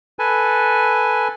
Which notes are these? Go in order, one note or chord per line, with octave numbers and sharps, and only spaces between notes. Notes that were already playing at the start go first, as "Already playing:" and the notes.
A4 B4 G#5